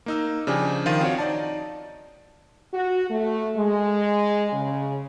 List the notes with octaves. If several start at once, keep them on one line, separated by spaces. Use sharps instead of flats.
A#3 D#4 E6
C#3 F3 D4 G4 G#5
D#3 F3 F5 C6 A6 D#7
C4 F4 F#4 C#5
D#4 D5 A5
F#4
A3
G#3
C#3